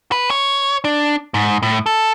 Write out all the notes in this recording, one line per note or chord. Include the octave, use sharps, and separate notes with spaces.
B4
C#5
D4
G#2
A2
A4